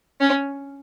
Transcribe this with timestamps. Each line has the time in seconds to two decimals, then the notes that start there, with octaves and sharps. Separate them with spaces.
0.20 C#4